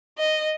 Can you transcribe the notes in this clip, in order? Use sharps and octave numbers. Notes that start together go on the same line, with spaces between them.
D#5